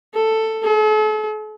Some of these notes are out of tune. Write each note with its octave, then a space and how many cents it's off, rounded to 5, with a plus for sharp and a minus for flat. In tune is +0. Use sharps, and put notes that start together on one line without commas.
A4 +10
A4 -45